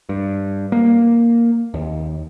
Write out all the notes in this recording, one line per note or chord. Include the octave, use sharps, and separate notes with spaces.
G2
A#3
D#2